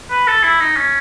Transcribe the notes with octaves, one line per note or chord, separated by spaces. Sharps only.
B4
A4
E4
D#4
C#4